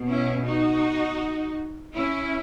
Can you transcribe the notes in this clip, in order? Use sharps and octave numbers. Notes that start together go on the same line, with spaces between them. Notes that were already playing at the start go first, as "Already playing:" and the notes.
Already playing: B2
C#4 E4
D#4 F#4
C#4 E4